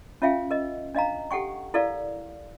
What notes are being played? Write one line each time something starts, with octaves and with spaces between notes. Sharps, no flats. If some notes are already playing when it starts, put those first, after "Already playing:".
C#4 F4 E5 F5 G5
A#4 D#5
D4 D#5 F5 A#5
G4 A4 F#5 G5 C#6
E4 A4 A#4 D5 F5